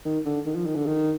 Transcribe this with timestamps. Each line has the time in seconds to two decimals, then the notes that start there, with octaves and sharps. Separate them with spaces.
0.05 D#3
0.25 D3
0.46 D#3
0.55 F3
0.66 D#3
0.75 D3
0.86 D#3